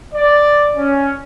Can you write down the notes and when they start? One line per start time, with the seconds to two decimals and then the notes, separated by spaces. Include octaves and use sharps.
0.14 D5
0.77 C#4